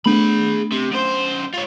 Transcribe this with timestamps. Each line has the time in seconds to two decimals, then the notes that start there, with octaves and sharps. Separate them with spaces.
0.06 A3 B3 D4 G#4 B5
0.72 C3
0.92 F#2 C5
1.54 F4 C#5